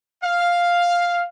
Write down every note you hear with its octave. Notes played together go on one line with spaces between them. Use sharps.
F5